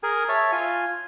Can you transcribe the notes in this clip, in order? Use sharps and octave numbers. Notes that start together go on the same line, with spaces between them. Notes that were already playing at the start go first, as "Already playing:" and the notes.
G#4 A#4 G#5
C#5 E5 A5
F4 G#5